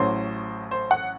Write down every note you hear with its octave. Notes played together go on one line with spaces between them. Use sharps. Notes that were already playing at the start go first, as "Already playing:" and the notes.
Already playing: A1 A2 F#3 C5
C5
F#5